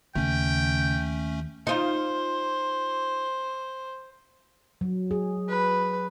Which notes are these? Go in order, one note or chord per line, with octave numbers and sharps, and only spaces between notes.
D#2 C#3 A3 C#4 G5
D#4 F4 C5
F#3
G#4
B4